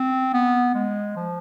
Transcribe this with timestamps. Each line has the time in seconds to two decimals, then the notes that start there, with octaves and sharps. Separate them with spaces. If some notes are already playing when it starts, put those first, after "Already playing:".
Already playing: C4
0.33 B3
0.74 G#3
1.16 F3